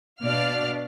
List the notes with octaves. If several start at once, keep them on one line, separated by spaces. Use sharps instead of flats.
B2 D4 D5 F5 F6